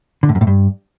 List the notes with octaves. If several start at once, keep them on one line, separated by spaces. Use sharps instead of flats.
D3
A2
F#2
A2
G2